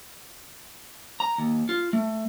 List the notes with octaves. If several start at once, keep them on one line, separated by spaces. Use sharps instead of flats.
A#5
D#2
F4
A3